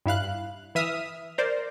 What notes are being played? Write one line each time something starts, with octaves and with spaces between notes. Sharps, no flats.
G2 E4 F5 F#6
E3 E5 D#6 F6
A#4 C5 D5